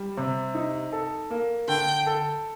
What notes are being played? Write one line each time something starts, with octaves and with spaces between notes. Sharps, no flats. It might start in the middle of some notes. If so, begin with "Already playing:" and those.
Already playing: G3
C3
D#4
A4
A#3
D3 G5
A4